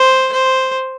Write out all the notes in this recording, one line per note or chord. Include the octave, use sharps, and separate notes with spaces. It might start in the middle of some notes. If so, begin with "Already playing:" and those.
Already playing: C5
C5